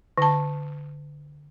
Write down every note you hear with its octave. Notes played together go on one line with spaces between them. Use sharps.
D3 A5